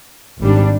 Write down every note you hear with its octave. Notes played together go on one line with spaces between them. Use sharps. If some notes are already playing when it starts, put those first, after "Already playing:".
G#1 G#2 G3 D4